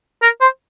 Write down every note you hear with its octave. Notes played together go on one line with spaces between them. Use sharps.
A#4
C5